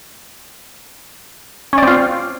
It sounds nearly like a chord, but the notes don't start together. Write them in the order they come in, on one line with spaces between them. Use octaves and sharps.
C#4 D5 C4 F4